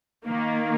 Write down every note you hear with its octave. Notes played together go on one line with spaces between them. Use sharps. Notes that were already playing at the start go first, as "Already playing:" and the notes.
D#3 A#3